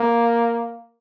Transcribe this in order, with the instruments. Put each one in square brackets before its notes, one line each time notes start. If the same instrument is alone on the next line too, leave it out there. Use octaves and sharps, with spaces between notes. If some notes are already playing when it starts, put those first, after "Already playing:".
Already playing: [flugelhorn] A#3